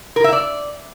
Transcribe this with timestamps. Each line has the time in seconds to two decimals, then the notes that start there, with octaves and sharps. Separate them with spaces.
0.16 A#4
0.24 E5
0.33 D5